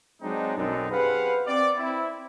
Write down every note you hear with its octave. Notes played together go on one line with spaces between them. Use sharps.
F#3 G#3 C4 D4 D#4
B1 F#2 C4 D4 D#4 A4
G4 G#4 B4 C5 F5 F#5
C4 D5
C4 E4